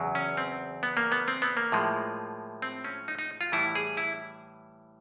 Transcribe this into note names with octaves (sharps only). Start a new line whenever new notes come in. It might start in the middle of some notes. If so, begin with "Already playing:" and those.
Already playing: E2 C#3 F#3
C#4
C4
B3
A#3
B3
C4
B3
A#3
A2 F3 G#3
C4
C#4
D#4
D#4
F4
A2 E3 G3 E4
G#4
E4